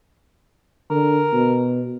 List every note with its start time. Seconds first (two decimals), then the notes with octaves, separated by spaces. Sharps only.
0.90 D3 A#4
1.33 B2